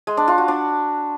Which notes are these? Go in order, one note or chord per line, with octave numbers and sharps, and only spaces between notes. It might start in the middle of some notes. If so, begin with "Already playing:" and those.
G#3
D4
F4
F#4
D4